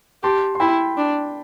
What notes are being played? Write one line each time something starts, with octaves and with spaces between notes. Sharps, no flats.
G4 A5 C6
C6
E4 G5 B5
D4